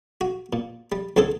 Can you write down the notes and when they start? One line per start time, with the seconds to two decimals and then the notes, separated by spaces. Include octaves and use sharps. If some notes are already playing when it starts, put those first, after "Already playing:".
0.21 F#4
0.53 A#2
0.92 G3
1.16 C#2 D3 C4 G#4 A4